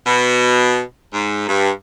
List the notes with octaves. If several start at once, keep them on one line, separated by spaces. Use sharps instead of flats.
B2
G#2
G2